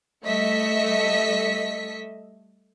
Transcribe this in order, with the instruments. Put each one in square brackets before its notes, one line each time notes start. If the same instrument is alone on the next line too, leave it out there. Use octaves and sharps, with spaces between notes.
[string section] G3 A3 D#5 E5 B6 C#7